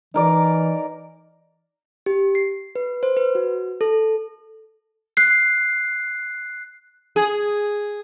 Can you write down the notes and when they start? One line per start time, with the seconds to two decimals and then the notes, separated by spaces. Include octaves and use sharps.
0.14 E3 D#4 A#4 D5
2.06 G4
2.35 C7
2.75 B4
3.03 C5
3.17 B4
3.35 F#4
3.81 A4
5.17 F#6 C7
7.16 G#4